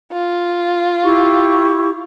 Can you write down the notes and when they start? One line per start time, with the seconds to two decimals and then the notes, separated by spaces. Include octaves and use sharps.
0.12 F4
1.03 E4 G4 C#6